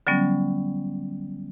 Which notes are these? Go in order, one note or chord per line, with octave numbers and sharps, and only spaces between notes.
D3 F#3 G3 B3 C#4